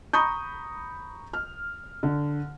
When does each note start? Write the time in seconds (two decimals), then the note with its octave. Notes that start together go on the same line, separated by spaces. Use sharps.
0.13 A#5 B5 C#6 D#6 G6
1.33 F6
2.03 D3